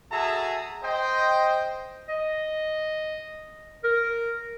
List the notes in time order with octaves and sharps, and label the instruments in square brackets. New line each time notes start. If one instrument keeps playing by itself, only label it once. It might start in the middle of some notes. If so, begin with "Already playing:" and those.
[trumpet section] F#4 G#4 A4 E5 A5 A#5
C5 D#5 G5
[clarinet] D#5
A#4